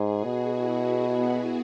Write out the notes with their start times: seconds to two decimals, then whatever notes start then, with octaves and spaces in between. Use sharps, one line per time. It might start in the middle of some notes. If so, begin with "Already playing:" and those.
Already playing: G#2 G#4
0.10 F#4
0.24 B2
0.38 E4
0.68 B3